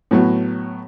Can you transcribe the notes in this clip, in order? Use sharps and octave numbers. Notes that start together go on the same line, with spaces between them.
A2 F#3 B3